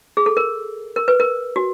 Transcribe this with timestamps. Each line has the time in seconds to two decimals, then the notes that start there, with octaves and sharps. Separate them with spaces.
0.17 G#4
0.26 A4
0.37 A#4
0.96 A#4
1.08 B4
1.20 A#4
1.56 F#4